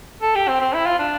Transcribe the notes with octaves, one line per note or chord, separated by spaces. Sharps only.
A4
G4
C4
C4
E4
F4
D4